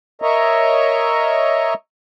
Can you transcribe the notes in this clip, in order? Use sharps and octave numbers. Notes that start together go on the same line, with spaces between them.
A#4 C#5 D#5 E5 A#5